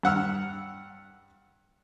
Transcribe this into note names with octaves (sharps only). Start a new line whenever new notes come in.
G2 F#5 E6 F6